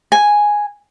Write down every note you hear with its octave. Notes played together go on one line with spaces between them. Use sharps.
G#5